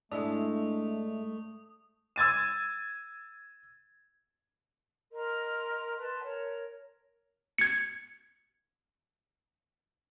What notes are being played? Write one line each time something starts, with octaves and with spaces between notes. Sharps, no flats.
G#2 G#3 A3 D4 E4 E5 D#6
E6 G#6 A6 D#7
A#4 D#5 C6 F6
B4 A5 C6
A#4 C#5
G#6 C#7